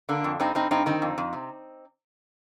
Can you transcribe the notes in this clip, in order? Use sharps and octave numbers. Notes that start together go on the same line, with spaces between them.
D3 A#3 D4
F2
G2 C4 D#4
G2 C4 D#4
G2 C4 D#4
D#3 C4 D#4
F2
F2
C3